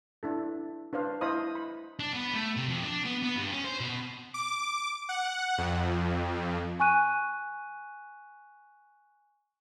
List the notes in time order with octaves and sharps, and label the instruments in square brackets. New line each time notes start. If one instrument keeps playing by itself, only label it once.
[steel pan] D4 E4 A4
D4 B4 C5 F5
E4 C5 D#5 F5 B5 D#6
B5
[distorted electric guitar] D4
B3
A3
C3
F2
D4
B3
B3
G2
C#4
C5
B2
[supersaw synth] D6
F#5
F2
[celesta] G#5 C#6 F#6 D#7